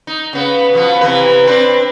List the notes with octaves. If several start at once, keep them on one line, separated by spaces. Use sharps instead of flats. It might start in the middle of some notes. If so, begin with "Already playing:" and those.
D#4
C#3 B3
B2 F3 B3
C3 E3 B4
C4 D4 B4